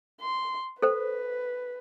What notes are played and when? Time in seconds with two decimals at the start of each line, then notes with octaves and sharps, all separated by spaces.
0.21 C6
0.82 A4 B4 C5